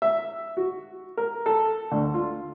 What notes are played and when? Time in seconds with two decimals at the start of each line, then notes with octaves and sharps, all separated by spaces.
0.02 E5
0.57 F#4
1.17 A#4
1.46 A4
1.92 D2
2.14 F4